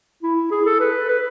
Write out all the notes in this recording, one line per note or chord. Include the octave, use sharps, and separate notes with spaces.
E4
G#4
A4
B4
B4